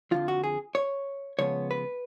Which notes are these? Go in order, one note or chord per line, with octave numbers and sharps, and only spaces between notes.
F2 D3 F3 F4
F#4
G#4
C#5
C#3 F3 G#3 B3 C#5
B4